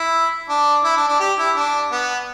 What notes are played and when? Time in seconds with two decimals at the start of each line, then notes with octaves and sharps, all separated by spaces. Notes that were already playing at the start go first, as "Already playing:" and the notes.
Already playing: E4
0.49 D4
0.84 E4
0.97 D4
1.08 D4
1.20 G4
1.38 E4
1.56 D4
1.92 B3